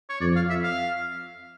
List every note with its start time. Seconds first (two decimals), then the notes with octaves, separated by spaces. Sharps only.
0.10 C#5
0.21 F2 D5
0.36 F5
0.50 E5
0.64 F5